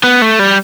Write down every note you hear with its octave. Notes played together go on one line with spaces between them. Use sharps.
B3
A3
G3